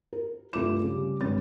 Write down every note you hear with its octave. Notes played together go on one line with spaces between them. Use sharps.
A#4
C2 G2 A3 F4 D6 E7
C#3 G3
G#1 G2 C#4 A6